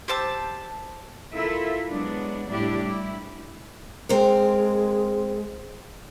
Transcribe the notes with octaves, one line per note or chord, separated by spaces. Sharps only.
G4 C5 A5 E6
E4 F4 A4 A#4 E5
F#3 G#3 B3 D4
A2 G3 D4 E4 G4
E4
G#3 C4 A#4